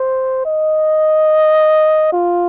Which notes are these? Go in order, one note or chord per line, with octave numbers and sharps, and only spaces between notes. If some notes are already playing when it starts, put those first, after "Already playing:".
Already playing: C5
D#5
F4